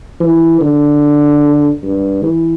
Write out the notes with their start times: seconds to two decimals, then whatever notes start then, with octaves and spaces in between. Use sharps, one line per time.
0.20 E3
0.61 D3
1.83 G2
2.23 E3